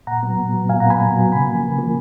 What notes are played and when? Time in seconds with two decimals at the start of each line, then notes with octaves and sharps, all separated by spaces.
0.07 A#2 F#5 A#5
0.23 F#3 B3
0.38 A#2
0.54 F#3 B3
0.69 A#2 F5 G#5
0.80 F#5 A#5
0.85 F#3 B3 G#5 B5
1.01 A#2
1.16 F#3 B3
1.32 C#3 G#5 B5
1.48 F3 A#3
1.63 C#3
1.79 F3 A#3